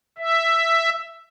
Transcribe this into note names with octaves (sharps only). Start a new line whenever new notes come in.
E5